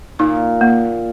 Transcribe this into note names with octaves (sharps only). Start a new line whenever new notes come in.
A#2 D#4
A#3